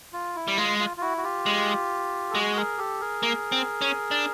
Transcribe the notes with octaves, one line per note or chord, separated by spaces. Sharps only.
F4
E4
G3
G#3 F4
F4
F4
E4 F#4
F#4
F4 G4
G#3
A4
G#3 F#4 G#4
G#4 A#4
G4 A4
G#4 A#4
A#3
C4
C#4
D4